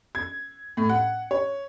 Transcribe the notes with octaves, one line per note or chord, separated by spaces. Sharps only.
G#6
A2
F#5
C#5